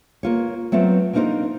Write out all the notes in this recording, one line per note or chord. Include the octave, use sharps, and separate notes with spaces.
A#3 F4 C#5
F#3 A3 B3 C4 F4
A#3 C4 D4 D#4 A#4 C5